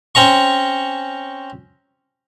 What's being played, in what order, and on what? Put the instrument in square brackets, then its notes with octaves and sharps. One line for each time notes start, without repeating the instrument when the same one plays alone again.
[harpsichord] C4 C#4 A#5 C#6